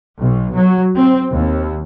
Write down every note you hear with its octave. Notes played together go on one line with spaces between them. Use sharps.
B1
F#3
C4
D#2